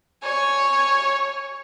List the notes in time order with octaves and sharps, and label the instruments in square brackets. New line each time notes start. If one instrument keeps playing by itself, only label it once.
[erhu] C#5 [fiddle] G#5 C#6